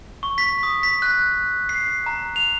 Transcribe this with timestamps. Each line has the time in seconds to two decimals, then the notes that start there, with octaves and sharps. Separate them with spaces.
0.23 C#6
0.38 B6
0.63 D#6
0.83 B6
1.02 F#6
1.69 C7
2.06 A#5
2.36 F7